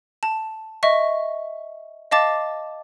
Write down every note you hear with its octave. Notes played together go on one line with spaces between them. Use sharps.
A5
D#5 E5 C#6
D#5 F5 A5 D6 A6